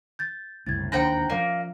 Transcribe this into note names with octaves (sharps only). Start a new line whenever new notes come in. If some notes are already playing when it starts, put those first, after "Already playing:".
G6 A6
F#1 C2 A2 G#6 A6
E1 D#2 D4 C5 F#5 G5 A#5 C#7
F3 A#3 C#4 D5